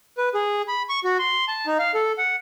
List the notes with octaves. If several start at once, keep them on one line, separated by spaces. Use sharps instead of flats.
B4
G#4
B5
C#6
F#4
C6
A5
D#4
F5
A4
F#5